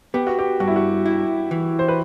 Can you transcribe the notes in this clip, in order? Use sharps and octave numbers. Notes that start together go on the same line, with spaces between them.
B3 G4
F#4
G4
G2 F#4
E4
F#4
E4
E3
C5
B4